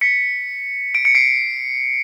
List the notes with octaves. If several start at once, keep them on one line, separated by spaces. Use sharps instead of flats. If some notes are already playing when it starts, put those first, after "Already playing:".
B6 C#7
D7
C#7
C7 D7